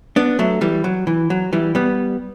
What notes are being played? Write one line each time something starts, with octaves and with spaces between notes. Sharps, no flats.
B3 D4
F#3 A3
E3 G3
F#3
E3
F#3
E3 G3
G3 B3